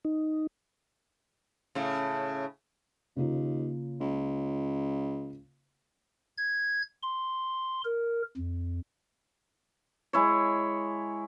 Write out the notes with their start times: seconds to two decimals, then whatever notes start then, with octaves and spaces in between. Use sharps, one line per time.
0.05 D#4
1.75 A2 C#3
3.16 D#2 C#3 A#3 F4
4.00 C#2
6.38 G#6
7.03 C6
7.85 A#4
8.37 F2
10.13 G#3 E4 C#5